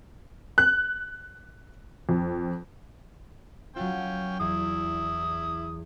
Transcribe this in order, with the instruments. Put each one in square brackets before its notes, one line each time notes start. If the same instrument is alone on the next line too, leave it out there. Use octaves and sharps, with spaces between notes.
[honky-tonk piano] F#6
F2
[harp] F#3 F4 [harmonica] C#4 G5
[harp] E2 [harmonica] E4 D#6